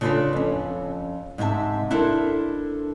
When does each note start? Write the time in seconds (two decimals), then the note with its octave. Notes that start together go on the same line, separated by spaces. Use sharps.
0.01 C#3 D4 F4 G#4 A4 B4
0.33 F2 C#4
1.38 G#2 C3 E4 E5 A5
1.90 D4 E4 A4 A#4 C5